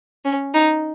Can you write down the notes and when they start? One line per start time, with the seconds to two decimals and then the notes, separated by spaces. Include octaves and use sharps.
0.25 C#4
0.54 D#4